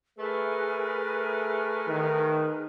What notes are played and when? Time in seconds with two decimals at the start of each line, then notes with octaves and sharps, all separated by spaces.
0.17 A3 G#4 A#4 B4
1.88 D#3